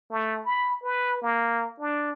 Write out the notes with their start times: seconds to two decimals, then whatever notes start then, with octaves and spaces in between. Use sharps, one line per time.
0.11 A3
0.45 B5
0.83 B4
1.22 A#3
1.79 D4